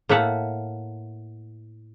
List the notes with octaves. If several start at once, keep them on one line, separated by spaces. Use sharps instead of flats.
A2 A#3 E5 F#5 A5